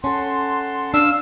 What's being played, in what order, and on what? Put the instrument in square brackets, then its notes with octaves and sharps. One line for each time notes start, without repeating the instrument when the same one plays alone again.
[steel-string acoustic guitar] C#4 A4 [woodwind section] F#5 A5 C6
[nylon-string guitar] D4 [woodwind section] F5 [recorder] E6